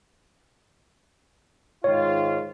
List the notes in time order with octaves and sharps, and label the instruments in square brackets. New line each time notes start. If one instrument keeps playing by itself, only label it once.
[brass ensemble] G#2 D#3 F4 [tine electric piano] C#5